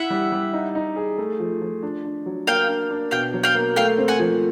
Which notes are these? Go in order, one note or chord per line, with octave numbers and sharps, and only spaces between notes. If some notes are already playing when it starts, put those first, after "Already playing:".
Already playing: E4 E5 F#5
G3
G3
D#4
D#4
G#4
A3
F3
F3
D4
D4
F#3
A#3 F5 G5
D4
D4
B2 F5 G5
F#3
F5 G5
A#3
A3 F5 G5
C4
F#5 G#5
F3